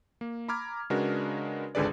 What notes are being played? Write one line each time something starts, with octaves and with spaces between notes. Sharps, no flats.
A#3
A#5 B5 D6 F6 G#6
C#3 G#3 D4 F#4 A#4 B4
G#1 C#2 D3 G#4 B4 D5